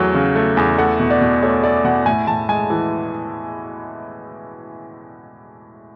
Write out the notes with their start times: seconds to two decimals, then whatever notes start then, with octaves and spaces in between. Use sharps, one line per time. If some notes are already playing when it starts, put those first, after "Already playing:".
Already playing: E2 F#3 A3
0.14 C#3
0.36 A3
0.57 E2
0.78 A3 F#5
1.00 B2
1.10 D5
1.21 B2
1.42 A3 C#5
1.63 A3 D5
1.84 B2 F#5
2.06 A2 G#5
2.27 A2 A5
2.49 G#3 G#5
2.70 E3